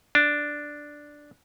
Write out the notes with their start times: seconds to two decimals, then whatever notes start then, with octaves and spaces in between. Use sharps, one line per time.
0.15 D4